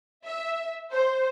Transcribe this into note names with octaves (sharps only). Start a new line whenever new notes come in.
E5
C5